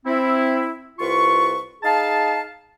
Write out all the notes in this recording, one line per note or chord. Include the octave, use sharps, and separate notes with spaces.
C4 E4
C2 F4 B4 C#6
D#4 G#4 F5 A5